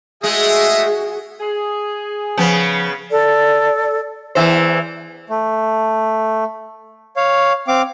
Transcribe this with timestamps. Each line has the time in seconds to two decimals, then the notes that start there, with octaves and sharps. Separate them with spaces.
0.24 G#3 A3 F#4 G#4 E5 D#6
1.40 G#4
2.38 C#3 F3 B3
3.10 A4 D5
4.35 E2 E3 C5
5.30 A3
7.16 C#5 F5
7.68 C4 F5 D6